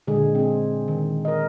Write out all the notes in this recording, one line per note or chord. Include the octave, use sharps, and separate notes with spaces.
A#2 D3 G#3 G#4
C4 G#4
D#3
A#4 D#5